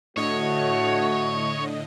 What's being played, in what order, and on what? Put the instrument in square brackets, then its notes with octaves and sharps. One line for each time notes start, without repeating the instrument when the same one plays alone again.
[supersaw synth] A2 D3 D#5 [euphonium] A3 [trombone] F#4 [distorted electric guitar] C#5